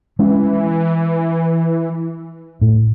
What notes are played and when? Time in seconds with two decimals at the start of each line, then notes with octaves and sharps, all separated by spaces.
0.19 E3 G#3 C#4
2.61 A2